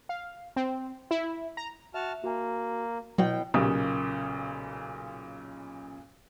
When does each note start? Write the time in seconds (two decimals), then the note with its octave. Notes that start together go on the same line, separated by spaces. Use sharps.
0.09 F5
0.56 C4
1.11 E4
1.57 A#5
1.94 F#4 E5 A5 F6
2.24 A#3 F#4 G#5
3.18 B2 F#3 E4 C#5 G5
3.54 B1 A#2 C#3 G4 D#6